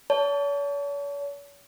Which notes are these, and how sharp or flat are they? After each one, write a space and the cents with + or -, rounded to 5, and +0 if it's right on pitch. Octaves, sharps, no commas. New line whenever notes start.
C#5 +45 A5 +0